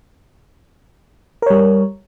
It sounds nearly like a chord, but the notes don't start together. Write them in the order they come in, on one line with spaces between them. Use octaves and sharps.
A#4 C#5 G3